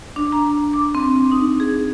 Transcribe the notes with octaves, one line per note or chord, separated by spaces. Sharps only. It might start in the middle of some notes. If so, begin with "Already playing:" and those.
D4
A#5
D6
C4
D#4
G#4